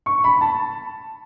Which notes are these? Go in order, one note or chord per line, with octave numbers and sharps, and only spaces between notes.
C#6
B5
A5